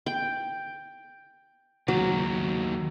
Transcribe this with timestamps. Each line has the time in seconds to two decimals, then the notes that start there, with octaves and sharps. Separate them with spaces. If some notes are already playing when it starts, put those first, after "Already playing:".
0.06 G5
1.88 D#2 C#3 F#3